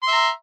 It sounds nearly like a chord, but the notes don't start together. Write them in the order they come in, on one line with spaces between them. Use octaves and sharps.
C6 E5 A#5